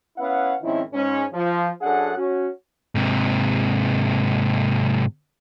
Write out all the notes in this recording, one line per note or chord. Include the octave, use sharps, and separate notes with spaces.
B3 C#4 E4 B4 F5 F#5
G#2 D#3 F3 C4 C#4 E4
G#2 C#4
F3
F#2 D4 G#4 A4 F#5
C#4 F#4
G#2 C3